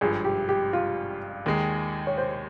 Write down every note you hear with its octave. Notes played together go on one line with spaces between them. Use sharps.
G#1 G2 F3 G#4
G4
G4
F4
D#2 D#3 G#3
C#5
C5